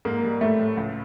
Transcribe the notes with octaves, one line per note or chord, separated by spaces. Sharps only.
G#2 A#3
G3
A2 A3
A2
C#2